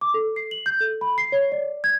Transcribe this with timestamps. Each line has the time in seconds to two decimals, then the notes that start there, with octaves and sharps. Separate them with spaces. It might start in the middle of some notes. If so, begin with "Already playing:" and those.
0.01 D6
0.14 A4
0.36 C7
0.51 F#7
0.66 G6
0.81 A4
1.01 B5
1.18 C7
1.32 C#5
1.52 D5
1.84 G#6